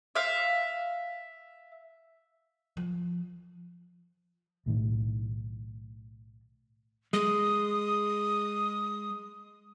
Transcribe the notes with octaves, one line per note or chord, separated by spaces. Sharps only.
E5 F5
F3
B1 A2 D#3
G#3 D#6